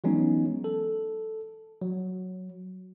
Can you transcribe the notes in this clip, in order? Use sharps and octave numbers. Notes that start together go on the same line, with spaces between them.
E3 F#3 G#3 B3 C#4 D#4
A4
F#3